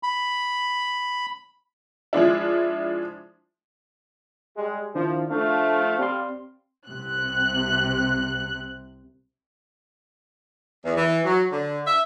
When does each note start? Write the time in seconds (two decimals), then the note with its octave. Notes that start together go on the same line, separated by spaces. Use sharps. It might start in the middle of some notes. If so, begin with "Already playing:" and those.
0.03 B5
2.13 F3 G#3 D4 E4
4.57 G3 G#3
4.95 D#3 F3 D4 E4
5.30 F3 A3 D4 F5
5.99 G3 C4 C6
6.88 C2 C3 F#6
10.85 E2
10.97 E3
11.25 F#3
11.52 D3
11.87 E5